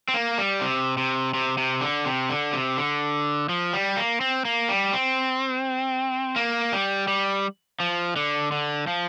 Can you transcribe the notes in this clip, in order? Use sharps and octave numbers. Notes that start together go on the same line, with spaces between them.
C4
A#3
G3
C3
C3
C3
C3
D3
C3
D3
C3
D3
F3
G3
A#3
C4
A#3
G3
C4
A#3
G3
G3
F3
D3
D3
F3